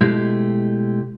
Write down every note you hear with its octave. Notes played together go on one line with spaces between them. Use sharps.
B2 G#3 A3 E4 G4